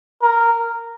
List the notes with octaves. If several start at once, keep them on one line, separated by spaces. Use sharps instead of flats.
A#4